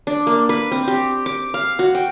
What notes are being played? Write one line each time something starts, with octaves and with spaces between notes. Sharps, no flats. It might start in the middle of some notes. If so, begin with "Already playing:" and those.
D4
A#3
B4
C4
G4
D6
F5
F#4
G5